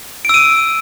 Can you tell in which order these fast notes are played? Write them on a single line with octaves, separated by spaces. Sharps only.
D7 E6 D#7